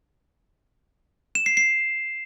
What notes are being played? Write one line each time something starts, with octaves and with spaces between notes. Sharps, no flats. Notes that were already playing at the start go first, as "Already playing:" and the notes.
E7
C7
C7